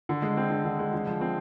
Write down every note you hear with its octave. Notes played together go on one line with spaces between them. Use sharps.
D3
G#3
C4
D3
D3
G#3
D3
F3
C4